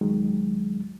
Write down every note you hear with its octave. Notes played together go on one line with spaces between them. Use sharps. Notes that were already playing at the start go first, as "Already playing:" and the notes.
C#2 D#3 F#3 G#3